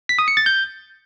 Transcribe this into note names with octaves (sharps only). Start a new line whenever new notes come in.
B6
D#6
C#7
A6
G6